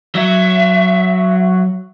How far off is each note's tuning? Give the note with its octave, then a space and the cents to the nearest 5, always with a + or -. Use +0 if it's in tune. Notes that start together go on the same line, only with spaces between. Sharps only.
F#3 +0 E5 +20